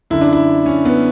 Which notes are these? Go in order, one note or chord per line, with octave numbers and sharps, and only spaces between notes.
F#2 D3 E4
D4
E4
C#4
B3